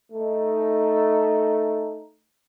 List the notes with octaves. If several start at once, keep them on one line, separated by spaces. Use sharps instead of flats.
A3 D#4